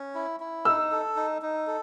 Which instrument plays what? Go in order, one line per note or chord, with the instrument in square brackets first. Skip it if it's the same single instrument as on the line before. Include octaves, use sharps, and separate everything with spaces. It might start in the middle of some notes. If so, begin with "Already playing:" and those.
Already playing: [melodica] C#4
E4
E4
[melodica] D#4 [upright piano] E6
[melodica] A4
D#4
D#4
A4